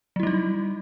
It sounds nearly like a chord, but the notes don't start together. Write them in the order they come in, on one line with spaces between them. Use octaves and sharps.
F#3 E4 G3 D#4